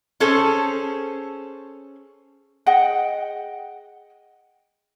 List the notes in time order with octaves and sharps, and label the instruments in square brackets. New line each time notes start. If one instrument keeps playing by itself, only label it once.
[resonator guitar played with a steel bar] C#4 G#4 A4 C5
[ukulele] G#4 D#5 F#5 G5